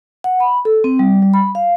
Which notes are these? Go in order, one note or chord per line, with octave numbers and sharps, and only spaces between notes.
F#5
B5
A4
C4
G3
G3
B5
F5